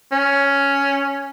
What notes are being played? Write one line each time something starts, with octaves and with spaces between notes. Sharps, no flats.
C#4